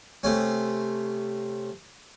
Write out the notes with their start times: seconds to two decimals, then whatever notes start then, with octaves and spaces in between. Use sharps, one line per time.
0.23 C3 A3 C#4